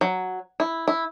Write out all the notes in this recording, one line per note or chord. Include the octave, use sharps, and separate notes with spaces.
F#3
E4
E4